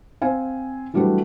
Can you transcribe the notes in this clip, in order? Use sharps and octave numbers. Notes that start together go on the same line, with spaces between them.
C4 C5 F5 G#5
E3 F#3 G3 A3 D4 B4